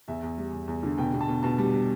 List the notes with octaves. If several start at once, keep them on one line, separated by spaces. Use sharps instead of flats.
E2 E5
E2
G3
E2
E2
D3
B2 G5
B2
A5
B2
B2 A5
G3
G3